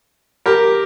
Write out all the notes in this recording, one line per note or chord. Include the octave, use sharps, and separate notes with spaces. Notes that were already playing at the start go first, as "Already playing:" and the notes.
G4 A#4